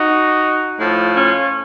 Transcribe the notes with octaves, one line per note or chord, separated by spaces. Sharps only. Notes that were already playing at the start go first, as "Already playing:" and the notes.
Already playing: D#4 F#4
A2 F3
C#4 F4